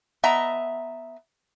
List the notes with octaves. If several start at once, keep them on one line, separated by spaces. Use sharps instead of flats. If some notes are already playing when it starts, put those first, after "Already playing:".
B3 D#5 E5 A#5